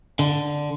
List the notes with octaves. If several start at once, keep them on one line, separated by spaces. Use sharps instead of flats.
D3